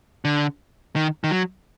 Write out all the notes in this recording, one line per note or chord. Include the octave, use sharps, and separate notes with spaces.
D3
D#3
D#3
F#3